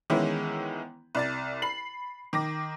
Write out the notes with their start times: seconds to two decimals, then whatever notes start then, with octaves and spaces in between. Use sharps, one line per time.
0.10 D#3 E3 G#3 B3 C#4 E4
1.15 C2 D5 A6
1.62 B5 C7 F#7
2.33 D#3 D6 A#6